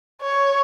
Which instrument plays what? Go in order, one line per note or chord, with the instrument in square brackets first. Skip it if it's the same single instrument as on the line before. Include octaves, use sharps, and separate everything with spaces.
[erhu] C#5